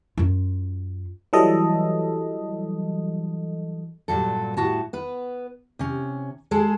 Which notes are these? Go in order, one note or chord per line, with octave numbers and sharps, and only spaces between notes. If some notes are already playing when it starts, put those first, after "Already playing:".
F#2 F4
E3 F#3 G3 A4 D#5
G2 A#2 F#3 A4
A2 F#4 A5
B3 B4
C3 C#4
G#3 G#4 A4